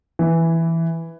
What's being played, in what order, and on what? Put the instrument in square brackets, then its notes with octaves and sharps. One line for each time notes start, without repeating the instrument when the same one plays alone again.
[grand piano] E3